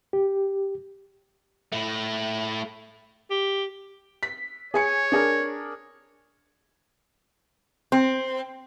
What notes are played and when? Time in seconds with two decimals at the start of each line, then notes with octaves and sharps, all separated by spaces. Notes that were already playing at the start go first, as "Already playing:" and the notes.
0.13 G4
1.72 A3 E4
3.30 G4
4.23 B6
4.74 G#4 C#5 G#5 C#7
5.12 D4 G#4 A#4
7.92 C4